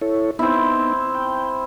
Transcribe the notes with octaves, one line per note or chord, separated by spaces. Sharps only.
E4 A4 C#5
B3 C4 D#4 E4
G5